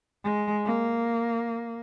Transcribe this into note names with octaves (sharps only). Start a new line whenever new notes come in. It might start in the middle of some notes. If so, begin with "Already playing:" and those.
G#3
A#3